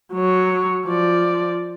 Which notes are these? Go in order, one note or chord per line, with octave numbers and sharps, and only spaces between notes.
F#3 C#5
F3 D5